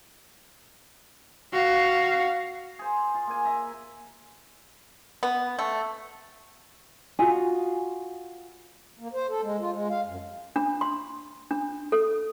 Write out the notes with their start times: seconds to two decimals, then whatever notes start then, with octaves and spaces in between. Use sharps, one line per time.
1.53 F#4 F5
2.79 G#4 C5
3.14 F4
3.27 A#3 G#5
3.45 E5 A#5
5.23 B3
5.59 A3
7.19 F4 F#4 G#4
8.99 A#3
9.14 C5
9.29 A4
9.43 G#3
9.60 F4
9.72 G#3
9.90 F5
10.06 F#2
10.56 D4
10.81 C6
11.51 D4
11.92 A4